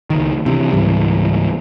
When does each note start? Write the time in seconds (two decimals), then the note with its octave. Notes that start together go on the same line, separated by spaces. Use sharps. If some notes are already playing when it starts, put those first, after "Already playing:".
0.10 C#2 D#3
0.46 C3 E3
0.72 C#2 G#2 E3 G3